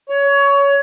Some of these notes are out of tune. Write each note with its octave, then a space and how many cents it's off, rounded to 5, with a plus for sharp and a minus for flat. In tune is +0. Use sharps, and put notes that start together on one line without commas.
C#5 +20